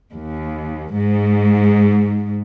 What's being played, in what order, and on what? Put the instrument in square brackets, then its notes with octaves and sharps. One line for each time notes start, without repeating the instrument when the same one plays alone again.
[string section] D#2
G#2